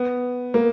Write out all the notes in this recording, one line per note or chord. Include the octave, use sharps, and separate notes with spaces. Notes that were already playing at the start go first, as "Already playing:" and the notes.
Already playing: B3
A#3